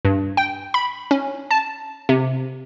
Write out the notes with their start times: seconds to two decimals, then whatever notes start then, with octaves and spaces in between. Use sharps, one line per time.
0.05 G2
0.37 G5
0.74 B5
1.11 C#4
1.51 A5
2.09 C3